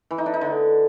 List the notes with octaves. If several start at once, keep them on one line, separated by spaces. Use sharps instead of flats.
E3
D#4
D4
D#4
D3